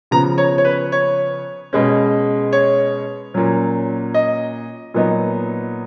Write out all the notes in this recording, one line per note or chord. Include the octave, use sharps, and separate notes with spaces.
C#3 F3 B3 A#5
C#5
C#5
B4
C#5
B2 G#3 C#4
C#5
A#2 F#3 C#4
D#5
A#2 F#3 B3 D#4